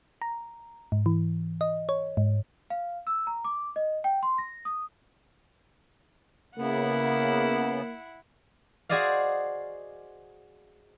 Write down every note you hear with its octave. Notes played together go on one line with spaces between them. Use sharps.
A#5
G#2
E3
D#5
C#5
G#2
F5
E6
A#5
D6
D#5
G5
C6
A#6
D#6
C#3 A#3 B3 E4 F#5
F#4 G#4 C5 D5 D#5 F5